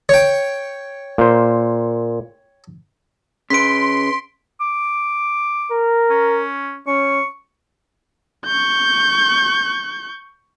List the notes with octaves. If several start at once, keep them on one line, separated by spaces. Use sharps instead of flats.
C#5 G5
A#2 C5
C#3 B4 C6 B6 D7
D6
A#4
C#4
C#4 C#6
C#6 G6